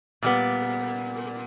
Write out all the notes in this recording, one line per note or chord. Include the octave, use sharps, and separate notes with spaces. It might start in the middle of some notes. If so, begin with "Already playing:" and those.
A#2 G3 B3